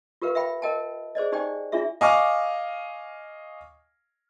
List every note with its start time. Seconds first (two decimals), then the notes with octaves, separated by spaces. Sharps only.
0.22 F4 G4 A#4 B4 F5
0.35 E5 F5 G5 B5
0.62 A#4 D#5 G5 A5
1.15 G#4 C5 D5 D#5
1.32 D#4 G4 C5 D5 G5 G#5
1.72 D4 E4 F4 G#4 E5
2.01 D#5 F5 G#5 C#6 D6 F6